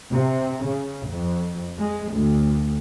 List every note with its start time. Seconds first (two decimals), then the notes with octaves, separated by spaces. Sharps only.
0.11 C3
0.64 C#3
1.08 F2
1.79 G#3
2.13 D2